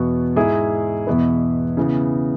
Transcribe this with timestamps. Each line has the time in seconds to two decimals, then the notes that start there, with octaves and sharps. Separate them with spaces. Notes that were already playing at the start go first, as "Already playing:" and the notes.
Already playing: E2 B2 B3 F#4
0.36 G#2 G#3 E4 G#4
1.07 E2 B2 B3 E4 B4
1.77 C#3 E3 B3